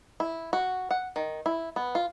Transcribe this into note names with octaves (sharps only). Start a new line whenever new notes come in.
E4
F#4
F#5
D#3
E4
B3
F4